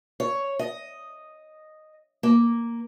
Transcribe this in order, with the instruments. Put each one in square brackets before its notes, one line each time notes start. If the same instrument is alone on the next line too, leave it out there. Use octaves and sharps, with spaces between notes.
[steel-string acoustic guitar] C#5
D#5
A#3